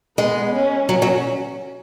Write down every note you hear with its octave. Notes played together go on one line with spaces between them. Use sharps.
G#3 B3
C#4
F#3 C#4
F#3